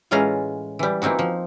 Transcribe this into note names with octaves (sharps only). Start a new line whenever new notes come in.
A2 E3 G#3 C#4 F4 A#5
E3 G3
E3 A#3 C4 D#4 F#4
F3